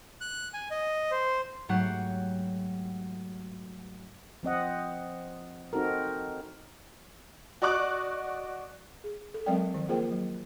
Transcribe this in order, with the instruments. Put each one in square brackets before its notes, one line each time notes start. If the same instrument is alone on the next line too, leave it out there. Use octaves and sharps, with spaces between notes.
[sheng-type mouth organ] F#6
G#5
D#5
C5
[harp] G#2 F#3 A3 G4 F#5 C7
[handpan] F3 C4 D#5 F#5
C4 D#4 F#4 A4 A#4
[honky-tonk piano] F#4 D5 D#5 C#6 D6 F#6
[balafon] G#4
A4
F#3 G#3 C4 A#4 D5 G5
D#3 F3
A#3 F4 G#4 A#4 C5 G5
F#3